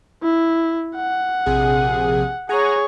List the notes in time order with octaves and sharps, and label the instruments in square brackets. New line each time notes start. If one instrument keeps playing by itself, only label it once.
[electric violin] E4
F#5
[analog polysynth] A#1 C3 G#4
[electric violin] G#4 C#5 [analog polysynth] F#5 G#5 A#5